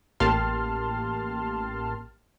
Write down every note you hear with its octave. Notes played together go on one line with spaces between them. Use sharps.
A1 A#3 G4 A5 C6 F6